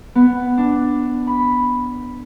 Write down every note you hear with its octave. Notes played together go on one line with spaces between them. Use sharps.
B3
D4
B5